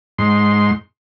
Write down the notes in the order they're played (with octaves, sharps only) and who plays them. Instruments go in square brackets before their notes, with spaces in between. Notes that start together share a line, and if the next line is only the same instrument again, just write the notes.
[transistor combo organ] G#2 C6